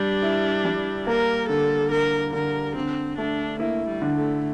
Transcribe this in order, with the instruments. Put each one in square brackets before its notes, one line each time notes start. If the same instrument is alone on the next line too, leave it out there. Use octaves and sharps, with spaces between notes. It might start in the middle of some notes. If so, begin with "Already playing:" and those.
Already playing: [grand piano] G3 G4 [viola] D4
[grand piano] E4
G3
[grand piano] A#3 [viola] A#4
[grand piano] D3 [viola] A4
[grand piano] D3 [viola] A#4
[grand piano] D3 [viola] A#4
[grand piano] D3 [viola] C4
[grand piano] A3 [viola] D4
[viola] A#3 [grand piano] E4
[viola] G3
[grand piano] D3
[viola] A3